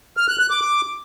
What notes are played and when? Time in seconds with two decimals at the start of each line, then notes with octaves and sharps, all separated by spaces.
0.17 F6
0.28 F#6
0.39 F#6
0.50 D6
0.61 D6